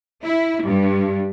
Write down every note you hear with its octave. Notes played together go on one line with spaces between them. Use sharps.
E4
G2